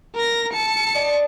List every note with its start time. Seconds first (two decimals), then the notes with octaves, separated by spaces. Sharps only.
0.15 A#4 A#6
0.53 A5 C#7
0.94 D5 D#5